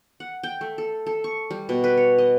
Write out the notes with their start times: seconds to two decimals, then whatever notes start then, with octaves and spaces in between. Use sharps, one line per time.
0.20 F#5
0.43 G5
0.61 A3
0.78 A4
1.06 A4
1.24 C#6
1.51 G3
1.69 B2
1.84 B4
1.97 C#5
2.18 D#5